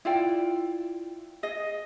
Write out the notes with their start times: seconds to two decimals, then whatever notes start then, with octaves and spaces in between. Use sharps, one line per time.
0.05 E4 F4 D5 G5
1.43 G#4 D#5